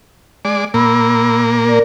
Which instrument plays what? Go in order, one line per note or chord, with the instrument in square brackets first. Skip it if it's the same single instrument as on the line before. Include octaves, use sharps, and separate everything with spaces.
[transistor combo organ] G#3 D5
[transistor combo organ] A#2 A#3 [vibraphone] B5 E6
[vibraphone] A#4 D5